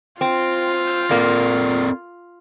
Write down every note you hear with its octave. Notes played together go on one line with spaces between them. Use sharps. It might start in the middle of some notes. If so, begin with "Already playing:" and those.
C4 F4
A#3 C4 A4 D5